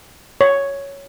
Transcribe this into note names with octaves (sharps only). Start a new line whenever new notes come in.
C#5